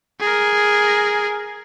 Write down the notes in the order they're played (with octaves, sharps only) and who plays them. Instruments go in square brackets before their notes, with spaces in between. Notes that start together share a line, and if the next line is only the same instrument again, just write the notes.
[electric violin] G#4 A#4